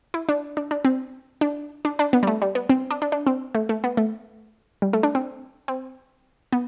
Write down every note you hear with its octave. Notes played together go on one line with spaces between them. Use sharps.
E4
D4
D4
D4
C4
D4
D4
D4
B3
G3
A3
G3
B3
C4
D4
D4
D4
C4
A3
A3
B3
A3
G3
A3
D4
C4
C4
B3